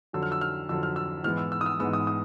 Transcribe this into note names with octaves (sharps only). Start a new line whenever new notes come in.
F2 D3 F#3 E6
F6
E6
F6
F2 D3 F#3 E6
F6
E6
G#2 E3 G#3 B3 F6
E6
E6
D#6
E6
G#2 E3 G#3 B3 E6
D#6
D#6